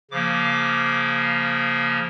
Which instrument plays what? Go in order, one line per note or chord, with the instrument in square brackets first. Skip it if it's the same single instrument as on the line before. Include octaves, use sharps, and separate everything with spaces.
[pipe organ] C#3 F3 A#3 D6